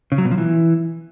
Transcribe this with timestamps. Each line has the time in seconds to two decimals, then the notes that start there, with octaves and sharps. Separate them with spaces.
0.12 C#3
0.18 F#3
0.25 B2
0.31 F3
0.38 E3